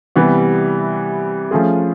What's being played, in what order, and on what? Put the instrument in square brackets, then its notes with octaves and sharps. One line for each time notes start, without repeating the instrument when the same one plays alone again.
[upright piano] C3 E3 G3 B3
F3 A3 C#4 F4 G#4